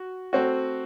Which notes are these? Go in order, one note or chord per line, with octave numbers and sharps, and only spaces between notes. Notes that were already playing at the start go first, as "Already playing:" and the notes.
Already playing: F#4
A3 C4 F#4